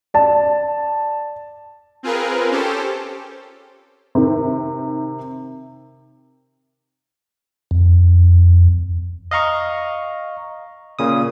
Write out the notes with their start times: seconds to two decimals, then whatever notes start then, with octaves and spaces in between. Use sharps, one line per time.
0.14 D5 A5
2.03 C4 F4 G#4 A#4 B4
2.51 C#4 G4 A4 C5
4.15 C3 D#3
7.71 F2
9.31 D#5 F5 A#5 C#6
10.99 A#2 C#3 D#6